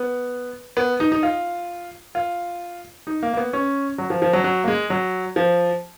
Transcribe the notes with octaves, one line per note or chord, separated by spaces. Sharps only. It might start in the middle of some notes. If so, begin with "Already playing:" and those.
Already playing: B3
B3
D#4
D#4
F4
F4
D#4
A#3
A#3
B3
C#4
F#3
F3
F3
F#3
F#3
A#3
G#3
F#3
F3